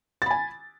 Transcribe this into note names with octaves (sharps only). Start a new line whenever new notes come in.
G#5 B5 A6